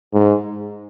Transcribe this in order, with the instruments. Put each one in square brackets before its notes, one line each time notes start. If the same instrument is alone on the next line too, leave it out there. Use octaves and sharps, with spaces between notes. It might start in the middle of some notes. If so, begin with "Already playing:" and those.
[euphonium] G#2